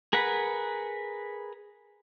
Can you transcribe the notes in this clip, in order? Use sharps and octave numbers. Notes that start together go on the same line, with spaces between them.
G#4 A#4 B4 F#5 B5